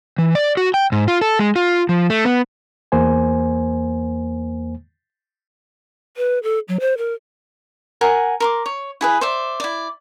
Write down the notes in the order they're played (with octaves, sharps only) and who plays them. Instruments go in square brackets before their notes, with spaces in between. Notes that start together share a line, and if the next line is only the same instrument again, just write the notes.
[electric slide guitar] E3
D5
F#4
G5
G#2
F4
A4
G#3
F4
F3
A3
B3
[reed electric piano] E2 A#3 C5 G#5
[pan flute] B4
A4
F#3
C5
A#4
[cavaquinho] A#4 F#5 G#5
A#4 C6 D6
C#5
E4 G#4 B4
C5 D5 E5
E4 D5